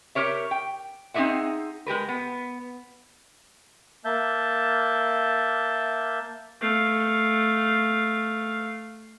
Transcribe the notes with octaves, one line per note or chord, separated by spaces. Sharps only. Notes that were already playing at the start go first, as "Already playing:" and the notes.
G4 A4 A#4 C#5 E5
G5
C4 D#4 G4 G#4 E5 F#5
G#3 G4 A#4 B4
B3
A#3 E5 A5 G6
A3 F5